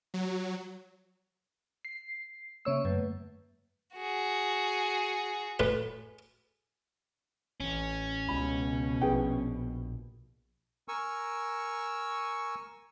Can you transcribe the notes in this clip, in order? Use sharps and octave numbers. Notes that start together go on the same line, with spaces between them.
F#3
C7
C#3 A#3 C#5 E5 E6
F#2 D3 A3 B4
F#4 G#4
A2 B4
A1 C#4
C#2 B2 B5
A#1 G#4 B4 G5
A#4 G#5 C#6 E6